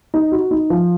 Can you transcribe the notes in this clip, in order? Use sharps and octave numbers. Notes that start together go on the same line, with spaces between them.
D#4
F#4
D#4
F3